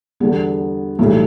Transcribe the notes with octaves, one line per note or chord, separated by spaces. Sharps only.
E2 D3 G3 B3
B1 A2 E3 G3 A3